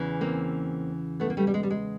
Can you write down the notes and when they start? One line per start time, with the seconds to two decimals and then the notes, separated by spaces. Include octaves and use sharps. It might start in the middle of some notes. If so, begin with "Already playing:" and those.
Already playing: E2 C#3 E3
0.21 A#3 C4
1.20 A3 B3
1.30 A#3
1.37 G3 A3
1.47 G3
1.54 G#3
1.63 G3
1.70 G#3